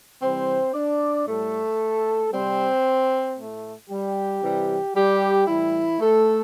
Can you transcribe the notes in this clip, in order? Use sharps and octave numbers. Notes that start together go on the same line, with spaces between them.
C3 E3 G3 C4 C5
D4 D5
A2 G3 A3 A4
C3 G3 C4 C5
A2 A3
G3 G4
C3 E3 G3
G3 G4
A2 E3 G3 E4
A3 A4